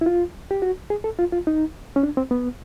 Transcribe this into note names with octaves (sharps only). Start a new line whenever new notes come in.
E4
F4
G4
F#4
G#4
A4
F4
F4
D#4
C#4
D4
C4
B3